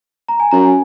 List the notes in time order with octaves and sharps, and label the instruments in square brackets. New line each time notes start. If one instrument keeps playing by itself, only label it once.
[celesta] A#5
G#5
[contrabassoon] F#2 [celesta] A#5
[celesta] G#5